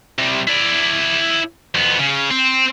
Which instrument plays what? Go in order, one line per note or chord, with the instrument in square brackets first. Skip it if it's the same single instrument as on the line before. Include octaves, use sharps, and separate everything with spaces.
[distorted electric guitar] C3 G3
E4 D5
F2 B3
C#3
C4